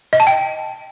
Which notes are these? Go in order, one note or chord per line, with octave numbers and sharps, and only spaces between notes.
D#5
A5
G5